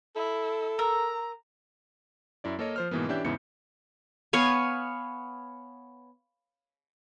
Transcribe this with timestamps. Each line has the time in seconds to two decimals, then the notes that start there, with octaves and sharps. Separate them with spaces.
0.16 E4 A4
0.79 A#4 A#5 E6
2.44 F#2 E4 D5
2.59 A#3 A4 A#4 C#5 D#5
2.76 F3 C5 F6
2.91 G#2 B2 E3 A#3 B3
3.08 E3 C#4 D4 G4 E5 G6
3.25 E2 G#2 C#3 B3 E4 C#7
4.33 B3 C#5 F5 G#5